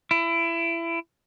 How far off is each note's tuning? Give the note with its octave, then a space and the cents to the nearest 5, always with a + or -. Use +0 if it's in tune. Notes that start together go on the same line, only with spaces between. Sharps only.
E4 +25